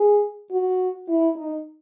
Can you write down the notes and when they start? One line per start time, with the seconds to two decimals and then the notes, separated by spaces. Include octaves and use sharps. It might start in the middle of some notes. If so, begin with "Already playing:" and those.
Already playing: G#4
0.51 F#4
1.08 E4
1.36 D#4